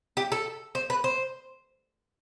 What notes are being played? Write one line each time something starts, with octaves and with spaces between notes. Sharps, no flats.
G4
A4
C5
B4
C5